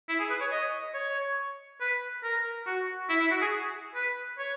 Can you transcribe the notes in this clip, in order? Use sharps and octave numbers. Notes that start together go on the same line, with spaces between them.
E4
G#4
B4
C#5
D#5
C#5
B4
A#4
F#4
E4
E4
F#4
G#4
B4
C#5